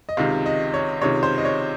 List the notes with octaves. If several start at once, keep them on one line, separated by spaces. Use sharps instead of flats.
D#5
C#2 C3 D#3 F5
D#5
C#5
C#2 C3 D#3 C#5
C5
D#5
C#5